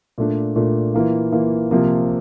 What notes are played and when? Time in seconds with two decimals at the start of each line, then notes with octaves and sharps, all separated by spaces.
0.18 A#2 A3 D4
0.56 A#2 A3 D4
0.94 E3 A#3 F4
1.32 E3 A#3 F4
1.71 C3 F3 A#3 F4